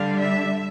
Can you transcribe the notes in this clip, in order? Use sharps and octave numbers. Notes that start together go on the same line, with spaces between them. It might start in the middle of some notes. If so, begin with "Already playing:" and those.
Already playing: D3 G3 D4 F5
E5